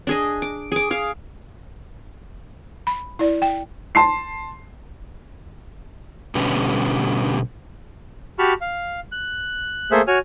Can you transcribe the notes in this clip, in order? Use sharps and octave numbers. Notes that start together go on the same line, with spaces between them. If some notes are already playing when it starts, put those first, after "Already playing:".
D4 G#4 D#5
D6
G#4 D6
G#4 F5
B5
E4 D5
G5
A5 C6 C7
B2 D3 G3 B3 C#4
F#4 G4 A5 B5 C#6 F6
F5
F#6
A3 A#3 G#4 A4 C5 E5
F#4 C#5 G#5 F6